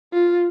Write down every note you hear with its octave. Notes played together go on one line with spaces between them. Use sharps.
F4